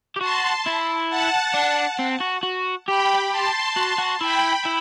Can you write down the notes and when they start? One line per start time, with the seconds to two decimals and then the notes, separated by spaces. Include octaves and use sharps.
0.16 G4
0.21 F#4 A5 C6
0.66 E4
1.10 F#5 A5
1.54 D4
1.99 C4
2.21 F#4
2.43 F#4
2.87 G4 G5 B5
3.31 A5 C6
3.77 F#4
3.98 F#4
4.21 E4 G5 B5
4.65 E4